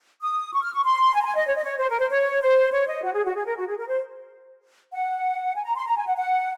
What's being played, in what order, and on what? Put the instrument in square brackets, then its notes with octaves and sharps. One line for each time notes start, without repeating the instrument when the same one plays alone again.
[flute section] D#6
C#6
F6
C#6
C6
G#5
A#5
G#5
D#5
C#5
D#5
C#5
C5
A#4
C5
C#5
C5
C#5
D#5
F#4
G#4
F#4
G#4
A#4
F#4
G#4
A#4
C5
F#5
G#5
A#5
C6
A#5
G#5
F#5
F#5